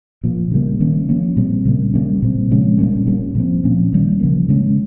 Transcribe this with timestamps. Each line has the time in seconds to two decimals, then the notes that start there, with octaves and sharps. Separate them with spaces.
0.23 A#2 F3 A#3
0.51 C#3 G3 A#3
0.80 D#3 G3 A#3 C#4
1.09 F3 A#3 C#4
1.36 A#2 G3 C4
1.65 C#3 G3 A#3
1.94 C#3 G3 A#3 C#4
2.22 A#2 G3 C4
2.51 C#3 F3 G#3 C#4
2.78 A#2 G3 A#3 C#4
3.07 A#2 G3 A#3 C#4
3.35 A#2 F3 C4
3.64 F3 A#3 C#4
3.93 D#3 G3 C#4
4.20 C#3 F3 A#3
4.49 C#3 G#3 C#4